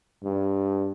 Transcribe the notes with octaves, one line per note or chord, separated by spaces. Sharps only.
G2